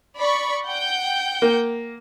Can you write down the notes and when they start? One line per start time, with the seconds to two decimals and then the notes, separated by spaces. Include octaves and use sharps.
0.17 D5 B5 C#6
0.65 F#5 G5 G6
1.42 A#3